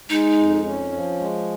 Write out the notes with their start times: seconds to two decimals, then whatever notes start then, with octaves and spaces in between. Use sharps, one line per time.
0.10 G#3 D#4
0.37 F2
0.64 C#4
0.92 F3
1.19 G#3